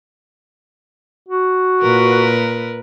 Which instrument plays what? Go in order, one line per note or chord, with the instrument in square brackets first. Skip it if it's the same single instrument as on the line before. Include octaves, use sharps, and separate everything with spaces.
[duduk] F#4
[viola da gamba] A#2 A#4 B4